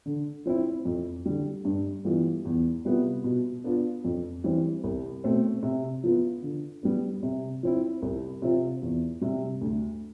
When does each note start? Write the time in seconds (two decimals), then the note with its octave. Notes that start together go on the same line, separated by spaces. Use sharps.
0.06 D3
0.46 F3 C4 E4
0.85 F2
1.26 D3 G3
1.65 G2
2.05 E3 G3 B3 F4
2.45 E2
2.85 C3 G3 B3 F4
3.24 B2
3.64 B3 D4 F4
4.05 F2
4.44 E3 G3 C4
4.84 C2
5.24 B2 A3 C4
5.63 C3
6.04 F3 B3 F4
6.42 D3
6.83 G3 B3
7.23 C3
7.63 F3 C4 E4
8.02 C2
8.42 C3 F3 C4 F4
8.83 E2
9.21 C3 G3
9.61 D2